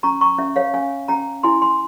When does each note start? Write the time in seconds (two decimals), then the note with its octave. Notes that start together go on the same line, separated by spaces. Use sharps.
0.03 C#4 A#5 C#6
0.21 A#5 C#6
0.38 C#4 E5
0.56 C#5 F5
0.74 C#4 F5 G#5
1.08 C#4 G5 A#5
1.43 E4 G#5 C6
1.62 G#5 C6